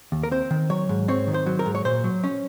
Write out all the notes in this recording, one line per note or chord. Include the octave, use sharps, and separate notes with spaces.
D#2
A#4
C4 C5
D#3
F#3 C#5
G#2
C4 C#5
D#3
C5
F#3
A#4
G#2
C#5
A#2 C5
F#3
C#4